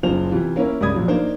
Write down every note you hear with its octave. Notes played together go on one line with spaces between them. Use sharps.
F#1 F#2 F4 C5 F7
C3 E3 F4
A#3 C#4 E4 A#4
C#2 G2 D5 B5 D#6 G#6
A#1 F3 F#3
A#3 D4 D#4 C5